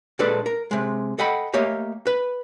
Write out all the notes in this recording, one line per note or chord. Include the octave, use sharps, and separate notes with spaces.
A#2 G#3 D4 A4 B4 D5
A#4
C3 G#3
A4 D#5 F#5 G5 B5
A3 A#3 G4 C#5 D#5
B4